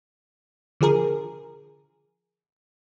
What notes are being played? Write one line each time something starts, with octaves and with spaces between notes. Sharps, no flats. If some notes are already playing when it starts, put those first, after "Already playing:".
D3 F3 G#4 A#4